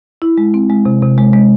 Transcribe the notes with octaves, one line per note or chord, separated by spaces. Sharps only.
E4
G#3
C4
G#3
C3
C3
G#3
G#3